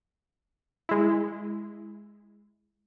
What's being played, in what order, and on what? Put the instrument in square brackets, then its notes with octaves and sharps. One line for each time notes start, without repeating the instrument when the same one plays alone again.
[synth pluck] G#3 E4